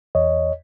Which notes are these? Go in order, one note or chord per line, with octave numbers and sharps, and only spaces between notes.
E2 C#5 D#5